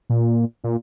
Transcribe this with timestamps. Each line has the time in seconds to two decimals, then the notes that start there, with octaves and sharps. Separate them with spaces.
0.10 A#2
0.64 A#2